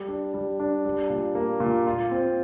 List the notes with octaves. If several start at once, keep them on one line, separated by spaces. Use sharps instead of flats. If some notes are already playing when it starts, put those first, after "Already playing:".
Already playing: G3
D4
G3
D4
G3
A#2
A#3
A#2
F4
C4